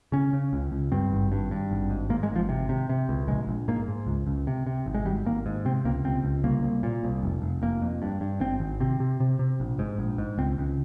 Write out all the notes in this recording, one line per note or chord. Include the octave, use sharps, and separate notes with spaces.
C#3 C#4
C#3
C#2
C#2
G2 C4
G#1
G2
G2
G#1
G#2
G#2 A#3
G#3
G#1
F3
C3
C3
C3
C#2
A#1 G#3
A#1
G#2 A#3
G#2
C#2
C#2
C3
C3
G#1
G#3
G#1 G3
G#1 A#3
G#2
C3 C4
C#2 A#3
C#2 C4
C#2
C2 A#3
C2
A#2
C2
F1
F1
F1 A#3
F2
G2
G2
G#1 C4
G#1
C3 C4
C3
C3
C3
A#1
G#2
A#1
G#2
C#2 C4
C#2